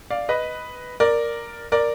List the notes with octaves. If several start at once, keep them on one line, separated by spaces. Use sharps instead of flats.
D5 F5
B4 D#5
A#4 D5
A#4 D5